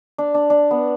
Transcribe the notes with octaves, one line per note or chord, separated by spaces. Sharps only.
D4
D4
D4
B3